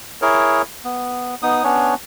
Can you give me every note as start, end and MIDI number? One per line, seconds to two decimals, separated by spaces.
0.22 0.62 64
0.22 0.62 68
0.22 0.62 70
0.22 0.62 73
0.85 1.35 59
1.42 1.64 59
1.42 1.64 63
1.42 1.64 87
1.64 1.94 59
1.64 1.94 61
1.64 1.94 62
1.64 1.94 73